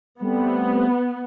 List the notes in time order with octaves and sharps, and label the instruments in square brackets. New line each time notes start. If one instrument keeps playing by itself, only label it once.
[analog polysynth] G3 A3 C4 [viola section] B3